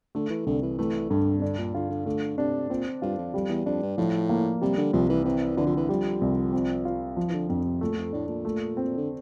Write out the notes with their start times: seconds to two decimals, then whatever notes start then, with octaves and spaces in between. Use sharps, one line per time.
0.15 D3 A3
0.30 E3
0.46 C2 D3
0.63 E3
0.78 E3 A3
1.10 G2 D3
1.38 C3
1.42 D3 D4
1.58 A#2
1.74 D3 F4
1.90 D3
2.06 D3 A3
2.38 C3 D4
2.70 A#2 C4
3.02 G2 F4
3.18 F2
3.34 F2 G3
3.49 E2
3.65 F2 D4
3.82 G2
3.98 A2 F3
4.29 A#3
4.61 C3 G3
4.77 D3
4.93 C2 F3
5.09 E3
5.25 E3 C4
5.57 D3 E3
5.66 F3
5.77 E3
5.89 F3 G3
6.21 C2
6.53 C4
6.85 F4
7.17 F3
7.28 E3
7.33 D3
7.49 F2 D3
7.65 C3
7.81 A#2 A3
7.97 F2
8.13 A2 D4
8.28 A#2
8.45 A3
8.77 C4
8.97 D3